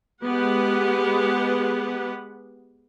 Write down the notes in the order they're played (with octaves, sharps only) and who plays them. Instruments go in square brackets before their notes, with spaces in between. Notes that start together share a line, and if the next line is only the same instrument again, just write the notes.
[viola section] G#3 B3 G4 B4 F#5